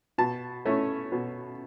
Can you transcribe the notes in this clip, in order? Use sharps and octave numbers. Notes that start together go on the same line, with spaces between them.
B2 A5
A3 C#4 E4
B2